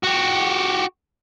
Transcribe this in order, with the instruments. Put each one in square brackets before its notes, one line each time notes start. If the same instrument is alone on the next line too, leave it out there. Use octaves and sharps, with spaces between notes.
[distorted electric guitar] F#4 G4